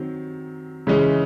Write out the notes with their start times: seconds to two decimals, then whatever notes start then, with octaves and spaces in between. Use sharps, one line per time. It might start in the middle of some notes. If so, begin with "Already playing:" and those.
Already playing: D#3 F#3 C4
0.87 C#3 E3 G#3 C#4